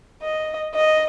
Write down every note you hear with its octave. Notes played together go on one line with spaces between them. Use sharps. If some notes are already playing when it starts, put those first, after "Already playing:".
D#5
D#5